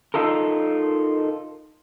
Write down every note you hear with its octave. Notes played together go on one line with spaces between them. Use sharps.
D#4 F4 A4 A#4